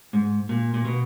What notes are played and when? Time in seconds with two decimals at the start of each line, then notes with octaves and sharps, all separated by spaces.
0.13 G#2
0.49 A#2
0.74 A#2
0.85 B2